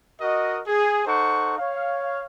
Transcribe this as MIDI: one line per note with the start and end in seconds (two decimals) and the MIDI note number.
0.21 0.60 66
0.21 0.60 70
0.21 0.60 75
0.67 1.02 68
1.06 1.55 63
1.06 1.55 69
1.06 1.55 72
1.06 1.55 78
1.06 1.55 85
1.58 2.26 73
1.58 2.26 77